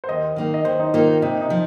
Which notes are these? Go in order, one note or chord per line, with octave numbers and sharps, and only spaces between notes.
C5
D#2 D#5
D#3 A#3 D#4
D#5
D#2 C5
D#4
D#3 A#3 D#4 F4
C3 D#4
D#4
F3